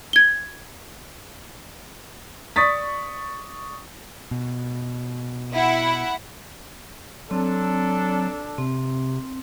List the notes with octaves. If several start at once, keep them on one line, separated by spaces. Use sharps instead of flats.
G#6 G7
D5 C#6 D#6 A6 B6
B2
E4 F#5
F#3 C4 D4 A4
C3 C4